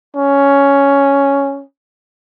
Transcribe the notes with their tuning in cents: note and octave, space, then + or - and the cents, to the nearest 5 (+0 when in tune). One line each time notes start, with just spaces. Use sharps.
C#4 +5